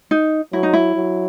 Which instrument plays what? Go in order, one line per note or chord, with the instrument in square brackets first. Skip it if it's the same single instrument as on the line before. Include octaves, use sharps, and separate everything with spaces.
[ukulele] D#4
[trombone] F#3 [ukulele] E4
[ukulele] D#4
E4
[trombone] F#3